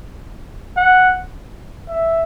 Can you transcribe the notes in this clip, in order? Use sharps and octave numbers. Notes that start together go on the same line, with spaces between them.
F#5
E5